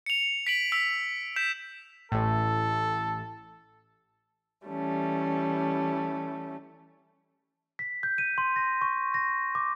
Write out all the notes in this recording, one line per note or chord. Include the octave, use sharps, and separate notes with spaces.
C#7 F7
B6 D7 F#7
E6 B6 F7
G6 B6 E7
A1 A2 A4
E3 G3 A3 C#4
B6
G6
D#7
C6
A#6
C#6
A#6
D6